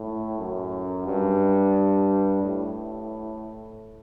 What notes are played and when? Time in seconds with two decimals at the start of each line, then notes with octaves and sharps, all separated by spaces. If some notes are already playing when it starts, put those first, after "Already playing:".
Already playing: A2
0.39 F#2
1.06 G2
2.42 A2